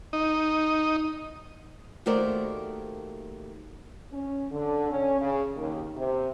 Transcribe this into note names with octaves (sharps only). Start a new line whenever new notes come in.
D#4
D#2 A3 F#4 A#4 C5 D5
C#4
D3
C#4
C#3
D#2
C3